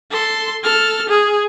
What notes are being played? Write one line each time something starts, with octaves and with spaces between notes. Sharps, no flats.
A4 C6
A4 F6
G#4